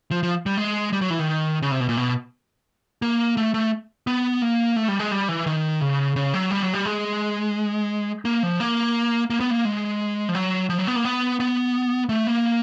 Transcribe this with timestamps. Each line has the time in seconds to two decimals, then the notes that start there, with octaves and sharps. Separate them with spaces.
0.11 F3
0.23 F3
0.46 G3
0.58 G#3
0.93 G3
1.01 F#3
1.10 E3
1.19 D#3
1.62 C#3
1.71 C3
1.80 B2
1.89 A#2
1.97 B2
3.02 A#3
3.37 A3
3.54 A3
4.07 B3
4.42 A#3
4.76 A3
4.88 G3
4.99 G#3
5.11 G3
5.29 E3
5.47 D#3
5.81 C#3
6.16 C#3
6.34 F#3
6.51 G3
6.63 F#3
6.74 G3
6.86 G#3
8.25 A#3
8.43 F3
8.60 A#3
9.30 A#3
9.40 B3
9.51 A#3
9.65 G#3
10.29 F3
10.35 F#3
10.70 F3
10.78 F#3
10.87 B3
10.96 A#3
11.05 B3
11.40 B3
12.09 A3
12.27 A#3